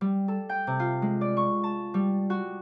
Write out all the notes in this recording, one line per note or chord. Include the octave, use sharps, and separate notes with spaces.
G3
A4
G5
C3
F4
G#3
D5
C#6
A5
G3
F#4